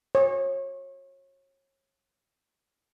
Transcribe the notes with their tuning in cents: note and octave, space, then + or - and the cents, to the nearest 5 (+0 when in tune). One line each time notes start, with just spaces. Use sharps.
C#5 -30